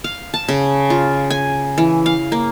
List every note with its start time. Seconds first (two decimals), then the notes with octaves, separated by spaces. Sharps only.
0.04 F5
0.34 A5
0.48 C#3
0.90 F4
1.30 G#5
1.78 E3
2.06 F5
2.32 A#3